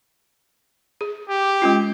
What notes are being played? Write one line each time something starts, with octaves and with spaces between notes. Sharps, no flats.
G#4
G4
G#3 C#4 F4